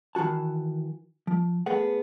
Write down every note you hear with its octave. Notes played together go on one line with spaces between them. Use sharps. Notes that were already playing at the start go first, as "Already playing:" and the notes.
D#3 E3 F4 F#4 A5
F3
A3 B3 G#4 F#5